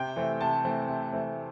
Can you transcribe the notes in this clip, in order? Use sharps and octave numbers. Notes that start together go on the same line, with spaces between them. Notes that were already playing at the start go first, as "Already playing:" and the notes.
Already playing: C3 G5
E3 A3 C4
C3 A5
E3 A3 C4
C3
E3 A3 C4